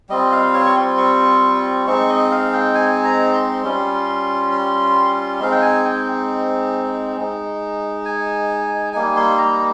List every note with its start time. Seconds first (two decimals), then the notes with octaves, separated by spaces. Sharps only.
0.09 G3 C4 F4 D#5
0.32 F5
0.54 C#5
0.66 C#6
0.76 C6
0.97 C#6
1.86 G#3 C4 D#4 C#6
2.09 D#5
2.31 F5
2.53 G5
2.75 G#5
3.05 A#5
3.34 C6
3.63 G3 C#4 F4
4.51 C6
5.40 G#3 C4 D#4 F5
5.52 G5
5.62 G#5
5.85 G5
7.16 G#3 D#4
8.05 G#5
8.93 G3 A#3 D#4 G#5
9.16 C6
9.38 A#5